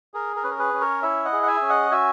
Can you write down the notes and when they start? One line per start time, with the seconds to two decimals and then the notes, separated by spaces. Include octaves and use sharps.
0.14 G#4 A#4
0.36 A#4
0.43 C#4 B4
0.51 A#4
0.59 G#4 B4
0.74 C#4
0.81 A#4 C#5
1.02 E4 C#5 E5
1.25 D#5 F#5
1.33 G#4
1.42 F#5
1.47 E5 G#5
1.62 C#4
1.69 D#5 F#5
1.91 F#4 E5 G#5